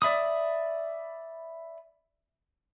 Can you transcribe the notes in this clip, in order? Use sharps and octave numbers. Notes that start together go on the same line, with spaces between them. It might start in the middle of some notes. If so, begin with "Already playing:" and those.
D5 E5 B5 D#6